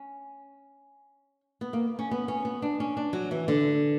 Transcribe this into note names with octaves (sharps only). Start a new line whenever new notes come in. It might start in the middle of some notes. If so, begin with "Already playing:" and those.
Already playing: C#4
B3
A#3
C#4
B3
C#4
B3
D4
C#4
D4
F#3
E3
D3